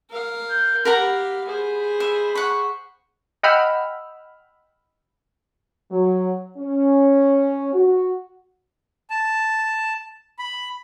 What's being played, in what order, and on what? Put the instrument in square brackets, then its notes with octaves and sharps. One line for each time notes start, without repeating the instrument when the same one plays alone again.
[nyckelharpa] A#4 F5
[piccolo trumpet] G6
[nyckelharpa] G4 F5 [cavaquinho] A#4 F#5 A#5 [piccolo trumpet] B5
[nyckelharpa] G#4 C5
[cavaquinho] E5
[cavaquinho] F#5 B5 [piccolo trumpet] C#6
[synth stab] D#5 F#5 G5 B5 E6 F6
[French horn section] F#3
C#4
F#4
[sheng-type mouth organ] A5
B5